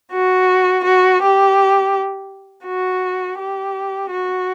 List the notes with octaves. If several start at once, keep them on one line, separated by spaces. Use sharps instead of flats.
F#4
F#4
G4
F#4
G4
F#4